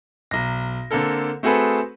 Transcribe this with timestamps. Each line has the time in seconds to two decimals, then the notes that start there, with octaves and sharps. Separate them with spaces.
0.31 B1 A#6
0.91 D3 A#3 C4 A4 A#4
1.43 A3 C4 F#4 G#4 A4 B4